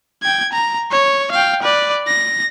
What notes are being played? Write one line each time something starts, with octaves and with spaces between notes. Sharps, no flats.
G5 G#6
A#5
C#5
F5 G5
B4 D5
A#6